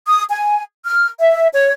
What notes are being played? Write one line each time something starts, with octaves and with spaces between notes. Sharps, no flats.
D#6
G#5
F6
E5
C#5